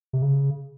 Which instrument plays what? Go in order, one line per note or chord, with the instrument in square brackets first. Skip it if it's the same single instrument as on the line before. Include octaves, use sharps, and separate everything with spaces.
[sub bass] C3
C#3